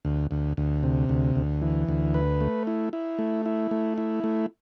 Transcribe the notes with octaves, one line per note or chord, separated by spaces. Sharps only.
D2
D2
D2
C3
D2
D2
E3
D2
B4
A3
E4
E4
A3
E4
A3
E4
A3